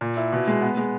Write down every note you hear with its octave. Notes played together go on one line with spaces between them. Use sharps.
A#2
E4
B2
G#3
B3
G#3